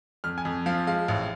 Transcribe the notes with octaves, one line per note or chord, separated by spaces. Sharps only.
F2 F6
G#5
F2
F3 F5
G#3 F5
A1